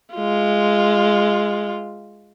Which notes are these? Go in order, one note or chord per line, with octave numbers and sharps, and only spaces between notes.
G#3 F4